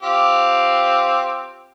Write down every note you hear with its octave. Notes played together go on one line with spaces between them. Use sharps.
C4 F4 G4